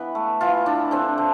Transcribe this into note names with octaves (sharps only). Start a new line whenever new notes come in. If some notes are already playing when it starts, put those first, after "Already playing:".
Already playing: E3 B3 B4
A3
E3 F4
E3 D4
D3 C4
D3